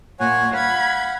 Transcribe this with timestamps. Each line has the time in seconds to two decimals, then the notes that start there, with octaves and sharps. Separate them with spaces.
0.20 A#2 C#5 F#5 G#5
0.54 F5 F#5 B5 G#6